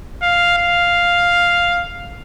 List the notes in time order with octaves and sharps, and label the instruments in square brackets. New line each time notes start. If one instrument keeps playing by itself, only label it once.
[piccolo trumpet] F5
F5